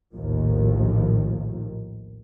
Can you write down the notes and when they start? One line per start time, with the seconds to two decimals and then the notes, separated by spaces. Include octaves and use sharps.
0.15 A#1 D#2 A2 D#3 F3